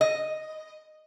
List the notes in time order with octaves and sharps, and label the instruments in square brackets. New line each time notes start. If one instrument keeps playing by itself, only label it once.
[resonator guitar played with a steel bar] D#5